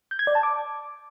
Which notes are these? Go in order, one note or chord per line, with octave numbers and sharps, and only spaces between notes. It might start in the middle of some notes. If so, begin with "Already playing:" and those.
G6
G#6
D5
A5
D6